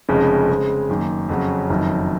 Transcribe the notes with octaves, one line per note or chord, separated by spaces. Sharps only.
F1 F2 C#3 G#3 C#4
C#3 G#3 C4
F#2 D#3 A#3
F2 C#3 F#3 C#4
F#1 F2 D#3 F#3